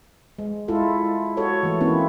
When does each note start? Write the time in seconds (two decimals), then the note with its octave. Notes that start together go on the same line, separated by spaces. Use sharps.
0.39 G#3
0.68 G#3 E4 F4 A4
1.37 F#4 A4 C#5
1.63 E3 A3
1.80 A#3 C4 C#4 D#4 E4